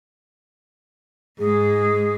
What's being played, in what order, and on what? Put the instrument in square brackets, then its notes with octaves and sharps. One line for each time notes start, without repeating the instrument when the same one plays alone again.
[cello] G#2 G#3 [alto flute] G#4